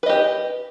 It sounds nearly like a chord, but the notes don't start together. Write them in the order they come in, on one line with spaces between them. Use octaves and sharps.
B4 D#5 G4